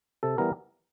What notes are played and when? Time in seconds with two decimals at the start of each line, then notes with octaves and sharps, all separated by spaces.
0.23 C3 A4
0.38 E3 G3 B3 A#4